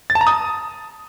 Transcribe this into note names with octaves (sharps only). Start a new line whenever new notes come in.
A6
A5
A#5
D#6